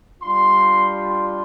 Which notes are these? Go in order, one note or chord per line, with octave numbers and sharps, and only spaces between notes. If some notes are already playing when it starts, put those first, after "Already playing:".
G3 D4 F4 C6
C6